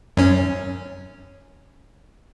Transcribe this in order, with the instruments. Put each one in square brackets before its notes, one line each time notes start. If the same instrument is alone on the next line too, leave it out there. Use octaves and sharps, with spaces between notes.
[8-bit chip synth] F#2 C#4